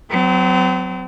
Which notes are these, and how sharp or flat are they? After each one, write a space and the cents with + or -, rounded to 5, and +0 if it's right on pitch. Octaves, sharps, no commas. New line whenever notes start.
F#3 +0 C4 -40